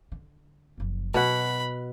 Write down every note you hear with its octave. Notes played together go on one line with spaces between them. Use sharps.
D3
F#1 F3
B2 F#3 F#5 B5